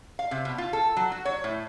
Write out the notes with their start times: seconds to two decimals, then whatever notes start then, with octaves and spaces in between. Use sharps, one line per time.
0.19 F5
0.31 C3
0.45 B2
0.58 F4
0.73 A4
0.97 F#3
1.12 F#4
1.25 C#5
1.44 A2